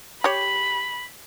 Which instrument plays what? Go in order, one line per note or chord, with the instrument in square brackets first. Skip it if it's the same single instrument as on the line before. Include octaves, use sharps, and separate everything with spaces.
[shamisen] G4 C#5 [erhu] B5